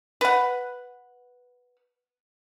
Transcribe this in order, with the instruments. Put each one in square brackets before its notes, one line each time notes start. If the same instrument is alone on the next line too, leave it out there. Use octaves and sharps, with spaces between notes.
[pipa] B4 F#5